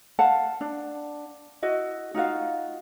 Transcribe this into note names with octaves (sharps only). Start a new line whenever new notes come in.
F5 F#5 A5
D4
E4 F#4 D#5
D#4 F4 F#4 F5